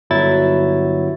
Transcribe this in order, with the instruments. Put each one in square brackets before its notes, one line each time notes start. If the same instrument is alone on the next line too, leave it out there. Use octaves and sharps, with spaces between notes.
[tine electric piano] G1 F#3 E4 A6